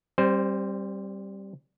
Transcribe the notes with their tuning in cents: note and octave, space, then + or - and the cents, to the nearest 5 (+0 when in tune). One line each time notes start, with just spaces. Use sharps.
G3 -5 C4 +35 C5 -10